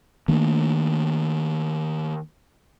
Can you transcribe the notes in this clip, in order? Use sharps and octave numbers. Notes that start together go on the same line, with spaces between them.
D#3 A3 A#3 D4